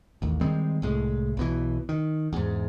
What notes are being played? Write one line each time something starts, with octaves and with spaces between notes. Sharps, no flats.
A1 D#2
D#3 G3 G#3 C4
C2 A2 G#3
B1 B2 E3
D#3
E2 G#2